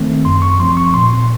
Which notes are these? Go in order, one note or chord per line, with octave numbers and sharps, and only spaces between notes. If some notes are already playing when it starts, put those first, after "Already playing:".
Already playing: D#3 A3 C4
F#2 C6
C#6
F3 C4 C6
C#6
A#2 C6